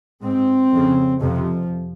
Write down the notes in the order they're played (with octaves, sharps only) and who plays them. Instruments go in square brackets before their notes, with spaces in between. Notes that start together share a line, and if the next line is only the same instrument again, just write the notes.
[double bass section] G#2 C4
F2 C#3
F2 C3 F3